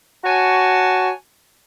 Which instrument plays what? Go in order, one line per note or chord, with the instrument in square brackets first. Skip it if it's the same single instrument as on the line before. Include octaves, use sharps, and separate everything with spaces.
[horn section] F#4 C#5 G#5 A5